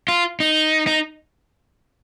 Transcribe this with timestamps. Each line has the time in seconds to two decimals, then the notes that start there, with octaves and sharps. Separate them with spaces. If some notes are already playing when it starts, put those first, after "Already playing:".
0.08 F4
0.40 D#4
0.87 D#4